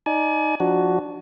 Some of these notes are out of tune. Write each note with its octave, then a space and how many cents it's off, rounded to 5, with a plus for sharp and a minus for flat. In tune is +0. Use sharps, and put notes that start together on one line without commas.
D#4 +5 D5 +0 G#5 +35
F3 +20 D4 +0 F#4 +10